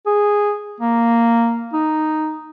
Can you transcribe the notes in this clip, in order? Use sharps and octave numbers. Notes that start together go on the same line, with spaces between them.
G#4
A#3
D#4